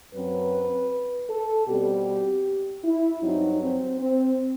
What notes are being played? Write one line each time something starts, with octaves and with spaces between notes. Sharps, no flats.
F#2 F#3 C4 B4
A4
B2 G3 C4 G4
E4
G2 F#3 C4 D#4
C4
C4